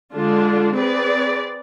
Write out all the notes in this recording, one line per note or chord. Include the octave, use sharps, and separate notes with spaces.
D3 G#3 D4 F4
C4 G#4 B4 D5